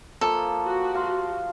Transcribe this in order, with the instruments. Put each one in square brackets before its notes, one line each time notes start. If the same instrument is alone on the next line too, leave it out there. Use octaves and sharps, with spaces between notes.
[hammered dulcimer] F3 A#3 [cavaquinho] A4
[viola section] F#4 G4
[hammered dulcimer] F5 A5 C6